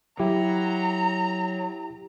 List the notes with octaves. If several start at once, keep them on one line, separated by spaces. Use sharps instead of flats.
F#3 E4 G4 A#5